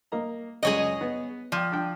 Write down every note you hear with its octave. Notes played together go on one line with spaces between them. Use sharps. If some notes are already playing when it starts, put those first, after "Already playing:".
A#3 D#5 A#5
C#2 F#2 G#3 G#4 C#5 D#5
B3
F3 D5 G5
D4 G5